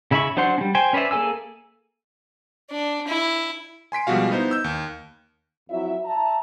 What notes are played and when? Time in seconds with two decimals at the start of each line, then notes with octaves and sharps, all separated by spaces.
0.11 C#3 E4 E5 B5 C#6
0.37 F#3 D4 C5 F#5 C6
0.58 G3 C#4
0.75 C5 G5 G#5
0.93 C#4 B4 C5 D5 E5
1.11 A#3 G#4 A4 G#5 E6
2.71 D4
3.07 E4
3.92 G#5 C6 B6 D7
4.07 B2 F3 G3 G#3 F#4 F5
4.31 B3 D#4 E4 C5
4.51 E6 G6
4.64 D#2
5.70 F2 F#3 E4 E5
6.05 E5 A5 A#5